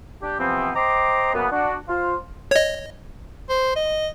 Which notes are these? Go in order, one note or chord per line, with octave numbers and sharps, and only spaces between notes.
D4 G4
C3 E3 F3 B3 C4
C5 D#5 G5 A#5 C6 D6
F#2 C#3 A#3 B3
D4 F#4
F4 C5 F5
C#5 D#5
C5
D#5